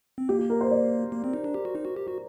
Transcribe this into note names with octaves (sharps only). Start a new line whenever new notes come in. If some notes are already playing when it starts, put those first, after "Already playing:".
C4
A#3 G4
G4
A#4
C5
D5
A#3
C4
D#4
D4
G4
F#4
D#4
F#4
G4
F#4